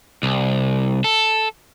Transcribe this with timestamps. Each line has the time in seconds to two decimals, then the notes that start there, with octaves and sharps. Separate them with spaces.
0.23 C2
1.04 A4